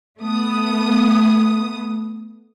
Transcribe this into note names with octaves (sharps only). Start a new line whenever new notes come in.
A3 B3 D#6